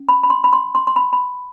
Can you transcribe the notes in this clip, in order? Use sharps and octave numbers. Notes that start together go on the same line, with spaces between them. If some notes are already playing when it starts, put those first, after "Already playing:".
Already playing: C#4
B5
B5
C6
B5
C6
C6
C6
B5
B5